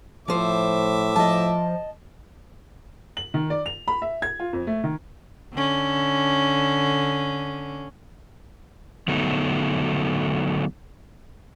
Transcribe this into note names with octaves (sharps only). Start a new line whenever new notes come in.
A2 F3 C5 E5 D6
F3 D#5 A5
F#7
D#3
D5
F7
B5
E5
G#6
F4
F2
A3
D#3
D3 C#4
D3 F#3 A3 B3 D#4